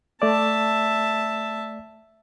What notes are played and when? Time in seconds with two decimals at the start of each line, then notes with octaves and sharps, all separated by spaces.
0.22 A3 D5 E5 A5